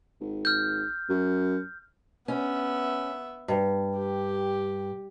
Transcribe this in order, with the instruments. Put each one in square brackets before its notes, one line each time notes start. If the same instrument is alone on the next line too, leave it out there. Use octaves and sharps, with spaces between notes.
[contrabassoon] G#1
[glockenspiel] F6 G6
[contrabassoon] F#2
[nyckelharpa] B3 E5 [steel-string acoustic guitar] C#4
[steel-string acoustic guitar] G2
[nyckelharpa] G4